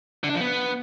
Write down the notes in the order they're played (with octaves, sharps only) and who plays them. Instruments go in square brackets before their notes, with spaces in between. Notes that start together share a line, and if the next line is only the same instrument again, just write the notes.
[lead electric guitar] D3
D4
F3
B3